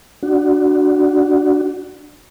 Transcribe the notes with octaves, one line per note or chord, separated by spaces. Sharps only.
D4 F#4